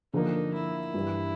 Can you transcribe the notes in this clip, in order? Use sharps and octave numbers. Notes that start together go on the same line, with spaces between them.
D3 F3 A#3 D#4
E4
G2 E3 G3